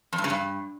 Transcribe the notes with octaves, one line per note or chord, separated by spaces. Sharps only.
F2
G2
C#3
G2